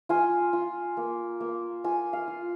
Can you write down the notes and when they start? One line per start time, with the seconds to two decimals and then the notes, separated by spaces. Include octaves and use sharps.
0.09 F4 G#5
0.53 F4
0.97 A#3
1.40 A#3
1.84 F4 G#5
2.13 F5
2.28 F4